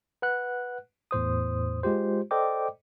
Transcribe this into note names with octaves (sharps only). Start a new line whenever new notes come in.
B4 F#5 F#6
E2 A2 C5 D#6
G#3 F4 G4 C5
A4 C5 D5 D#5 G5 D6